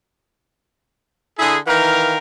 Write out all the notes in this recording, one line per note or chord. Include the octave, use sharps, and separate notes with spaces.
D3 E4 G#4
D#3 E3 A#4 F5